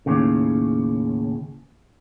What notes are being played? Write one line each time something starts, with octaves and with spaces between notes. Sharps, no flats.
D#2 A2 C#3